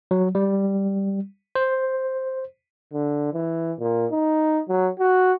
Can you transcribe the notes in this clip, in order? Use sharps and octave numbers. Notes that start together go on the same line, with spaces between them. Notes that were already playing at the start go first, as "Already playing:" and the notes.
F#3
G3
C5
D3
E3
A#2
D#4
F#3
F#4